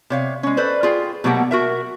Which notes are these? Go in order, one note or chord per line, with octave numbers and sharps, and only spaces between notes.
C3 C#5 F5
G#3 C#4
A4 B4 C5 D5
F4 G#4 G5
B2 F#3 A3 A#3 G4 F#5
F#4 A#4 E5